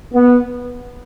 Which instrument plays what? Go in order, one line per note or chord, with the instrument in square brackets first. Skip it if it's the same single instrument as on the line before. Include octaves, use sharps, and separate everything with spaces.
[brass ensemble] B3